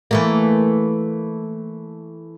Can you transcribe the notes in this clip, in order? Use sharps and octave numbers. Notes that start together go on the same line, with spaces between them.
E3 A3 A#3